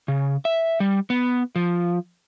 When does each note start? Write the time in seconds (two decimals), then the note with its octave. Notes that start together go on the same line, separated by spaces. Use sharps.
0.08 C#3
0.45 E5
0.80 G3
1.10 B3
1.56 F3